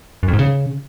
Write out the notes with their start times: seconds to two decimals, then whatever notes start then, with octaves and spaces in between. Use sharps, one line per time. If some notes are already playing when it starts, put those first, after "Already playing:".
0.23 F#2
0.28 F2
0.34 G#2
0.39 C#3